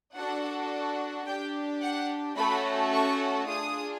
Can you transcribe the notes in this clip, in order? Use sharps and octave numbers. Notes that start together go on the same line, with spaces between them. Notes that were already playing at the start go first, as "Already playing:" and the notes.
D4 F#4 A4 F#5
D4 G4 G5
F#5
A3 C#4 F#4 A4 B5
C#6
D4 F4 G#4 D#6